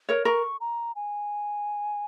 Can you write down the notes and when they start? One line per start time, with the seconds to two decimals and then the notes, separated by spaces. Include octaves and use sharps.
0.09 A#4 C#5
0.25 A#4 C#6
0.61 A#5
0.96 G#5